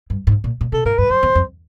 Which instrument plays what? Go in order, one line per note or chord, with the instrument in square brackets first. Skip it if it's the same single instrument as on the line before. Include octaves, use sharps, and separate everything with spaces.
[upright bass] G2
G#2
A#2
A#2
[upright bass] C3 [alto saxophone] A4
[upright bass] G#2 [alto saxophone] A#4
[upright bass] G2 [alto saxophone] B4
[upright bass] F#2 [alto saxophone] C5
[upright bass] E2
F2